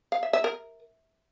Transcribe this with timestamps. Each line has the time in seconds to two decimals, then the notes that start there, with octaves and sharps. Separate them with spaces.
0.12 F5
0.23 E5
0.33 E5
0.44 A#4